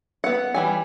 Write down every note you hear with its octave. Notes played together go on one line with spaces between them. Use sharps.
B3 F#5
E3 G3 G#5